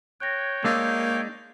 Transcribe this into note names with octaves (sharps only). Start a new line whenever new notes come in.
C#5 G5 F#6 A#6
G#3 A#3 D4 D#4 D6 E6